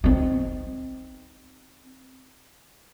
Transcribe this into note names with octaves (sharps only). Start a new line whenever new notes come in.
C4 D#4